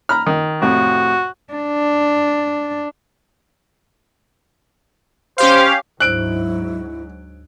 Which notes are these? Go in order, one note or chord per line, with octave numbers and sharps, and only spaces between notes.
A#5 B5 F6
D#3
F2 A2 C3 F#4
D4
C#4 G4 C5 F5
D2 G#2 F#3 E4 C5 E6 F#6 D7